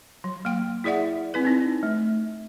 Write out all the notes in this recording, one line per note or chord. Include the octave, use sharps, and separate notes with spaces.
F#3
A#3 G5
E4 G#4 D5 E5 F#5
C4 E4 B4
C4 D#4
A3